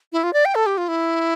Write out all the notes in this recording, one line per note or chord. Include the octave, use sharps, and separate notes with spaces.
E4
F4
D5
G5
A4
G4
F4
E4